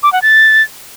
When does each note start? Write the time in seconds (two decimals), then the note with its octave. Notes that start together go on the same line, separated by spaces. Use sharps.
0.03 D6
0.12 F#5
0.22 A6